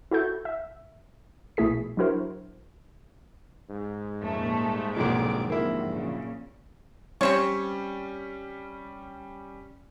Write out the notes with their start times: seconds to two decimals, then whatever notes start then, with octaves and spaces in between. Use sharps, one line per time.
0.11 E4 F#4 A4 G6
0.45 E5
1.57 A#1 B2 A3 E4 G#4 B6
1.97 F#3 D4 E4 F#4 A#4 C5
3.70 G#2
4.22 F2 A#2 A3 C#4 A#4
4.59 G3
4.97 B1 F2 A#2 D3 F3 F#3 D6
5.50 D#2 C3 A#3 E4
5.91 A#2 C#3
7.21 G3 C4 C#4 C5 C#5